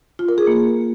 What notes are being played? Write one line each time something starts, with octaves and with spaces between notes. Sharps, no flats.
F4
A#4
G#4
A#3